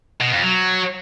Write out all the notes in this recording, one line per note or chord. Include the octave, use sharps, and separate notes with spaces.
B2
F2
F#3